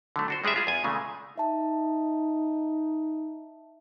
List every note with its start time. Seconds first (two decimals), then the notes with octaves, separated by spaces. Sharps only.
0.16 D3 F#3 A3
0.28 D4 F#4 C5
0.44 G3 G#3 G#4 D5 E5
0.56 F4 G#4
0.67 E2 G#5
0.84 A#2 C#3 G#3 A3
1.38 D#4 E5 A5